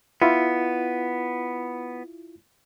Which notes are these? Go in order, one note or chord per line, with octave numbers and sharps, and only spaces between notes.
B3 E4 F4